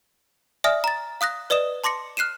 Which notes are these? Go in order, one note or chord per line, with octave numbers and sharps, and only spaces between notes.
D5 E5 G#5 D#6 F6 A#6
A#5 A6
F5 D#6 F#6 A#6
B4 D5 D#5 D#6 E7
A5 C6 D6 A#6 C#7
F6 F#6 C7 D#7 E7